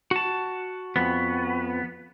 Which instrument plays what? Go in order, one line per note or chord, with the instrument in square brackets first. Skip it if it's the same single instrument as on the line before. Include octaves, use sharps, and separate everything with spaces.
[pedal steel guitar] F#4 A5
[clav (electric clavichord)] F2 [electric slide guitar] B3